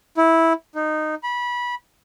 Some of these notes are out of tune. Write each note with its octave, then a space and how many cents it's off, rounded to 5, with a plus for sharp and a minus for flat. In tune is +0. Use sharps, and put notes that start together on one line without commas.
E4 -10
D#4 -15
B5 -20